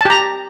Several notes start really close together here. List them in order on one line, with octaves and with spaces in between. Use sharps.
A5 G4 A#5